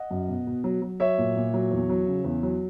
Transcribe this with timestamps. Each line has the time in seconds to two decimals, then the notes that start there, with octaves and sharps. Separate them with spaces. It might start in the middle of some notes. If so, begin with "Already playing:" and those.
Already playing: D#5 F#5
0.10 F#2
0.28 B2
0.47 B2
0.64 F#3
0.82 F#3
1.00 F#3 C#5 E5
1.18 A#2
1.36 A#2
1.54 F#3
1.71 E2
1.89 F#3
2.07 C#3
2.24 E2
2.43 F#3